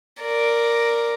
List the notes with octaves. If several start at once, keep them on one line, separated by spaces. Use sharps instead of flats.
A#4 D5